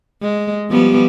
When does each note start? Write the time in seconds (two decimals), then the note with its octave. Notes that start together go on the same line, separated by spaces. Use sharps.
0.22 G#3
0.70 F3 G3 B3